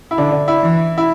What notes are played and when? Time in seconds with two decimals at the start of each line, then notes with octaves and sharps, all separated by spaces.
0.11 E4
0.17 D3 D4
0.32 D4
0.48 E4
0.62 E3
0.98 E4